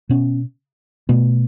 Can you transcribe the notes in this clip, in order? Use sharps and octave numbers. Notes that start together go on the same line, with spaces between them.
B2 B3 C#4
B2 A3 B3